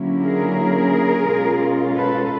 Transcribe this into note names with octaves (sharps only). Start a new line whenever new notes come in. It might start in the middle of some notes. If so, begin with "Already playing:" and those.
Already playing: D3 F#3 A#3 C#4 E4
G#4 A#4
B2 G#3 C#4 F4
A4 B4